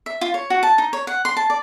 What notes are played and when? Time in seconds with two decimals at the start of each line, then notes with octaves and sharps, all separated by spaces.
0.06 E5
0.21 F4
0.34 C#5
0.50 F#4
0.63 A5
0.78 D#4
0.93 C#5
1.07 F#5
1.25 C6
1.37 A5
1.50 D5